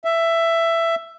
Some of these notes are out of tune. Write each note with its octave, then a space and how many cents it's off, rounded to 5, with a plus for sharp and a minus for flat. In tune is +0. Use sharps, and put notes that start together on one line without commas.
E5 +10